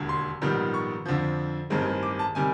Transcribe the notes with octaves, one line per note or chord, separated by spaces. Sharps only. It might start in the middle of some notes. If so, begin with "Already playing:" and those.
Already playing: E1 D#2 D3
C6
A#1 G#2 D#3 G3 B3
C#6
F2 D3 F3
A1 G2 D#3 G#3 C4
D6
A5
C3 D#3 G3 G#5